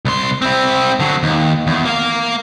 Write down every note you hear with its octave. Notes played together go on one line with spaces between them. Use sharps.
C2 C6
C4 E4
D3 F#3
D#2
E2
A#3 F5